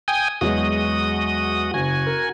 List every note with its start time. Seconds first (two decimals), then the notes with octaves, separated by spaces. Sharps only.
0.08 G5 G#5 D#6
0.41 E2 F#3 G#3 F#4 D#6
1.74 F#1 F#4 G#5
2.06 A#4